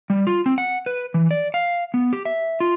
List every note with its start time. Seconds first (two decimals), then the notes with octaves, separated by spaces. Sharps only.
0.10 G3
0.27 F4
0.46 C4
0.58 F#5
0.86 B4
1.14 E3
1.31 D5
1.54 F5
1.94 B3
2.13 G4
2.25 E5
2.60 F4